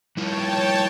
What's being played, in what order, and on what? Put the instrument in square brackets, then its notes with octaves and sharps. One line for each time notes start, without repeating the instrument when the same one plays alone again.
[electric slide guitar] G3 E4 F4 [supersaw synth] C#5 G5 A5